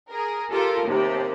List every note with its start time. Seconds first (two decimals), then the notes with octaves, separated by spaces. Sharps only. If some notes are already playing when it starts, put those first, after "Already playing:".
0.11 G#4 A#4
0.52 F4 G4 A4 A#4
0.87 D#2 C3 G4